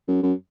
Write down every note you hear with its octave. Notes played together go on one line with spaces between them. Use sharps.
F#2
F#2